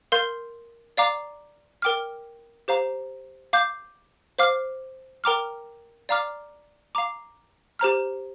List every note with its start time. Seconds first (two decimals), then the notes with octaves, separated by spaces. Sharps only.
0.12 A#4 F5 C6 G6
0.97 D5 F5 A#5 D6
1.82 A#4 G5 D6 F6
2.68 G4 C5 F5 A#5
3.53 F5 D6 G6
4.38 C5 F5 D6 F6
5.24 A#4 G5 A#5 D6 F6
6.09 D5 F5 A#5 D6 F6
6.95 F5 A#5 D6
7.79 G4 C5 A#5 F6